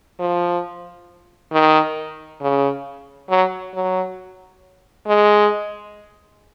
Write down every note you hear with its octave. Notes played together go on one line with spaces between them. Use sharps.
F3
D#3
C#3
F#3
F#3
G#3